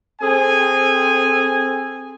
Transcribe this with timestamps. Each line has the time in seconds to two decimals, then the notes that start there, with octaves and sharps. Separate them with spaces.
0.21 C4 G#4 A4 G#5